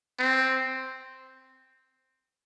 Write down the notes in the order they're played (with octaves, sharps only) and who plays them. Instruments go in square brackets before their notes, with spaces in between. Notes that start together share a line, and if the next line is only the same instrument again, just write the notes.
[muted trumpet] C4